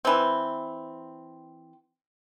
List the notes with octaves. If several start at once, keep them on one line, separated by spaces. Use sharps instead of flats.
E3 C4